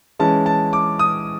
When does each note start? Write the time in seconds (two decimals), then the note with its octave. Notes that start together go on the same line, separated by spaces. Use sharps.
0.19 E3 G#3 C#4 E4 A5
0.46 A5
0.73 D6
0.99 D#6